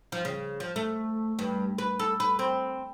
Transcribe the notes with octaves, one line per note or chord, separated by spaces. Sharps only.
F3
C#3
F3
A3
G2
B4
A4
B4
C4